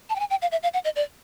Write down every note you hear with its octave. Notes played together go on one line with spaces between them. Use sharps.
A5
G5
G#5
G5
F5
E5
F5
F#5
D#5
D5